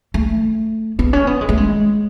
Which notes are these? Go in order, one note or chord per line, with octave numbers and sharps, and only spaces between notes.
A3
B3
C#4
B3
G#3
A3
G#3